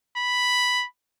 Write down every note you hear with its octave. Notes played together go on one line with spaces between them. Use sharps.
B5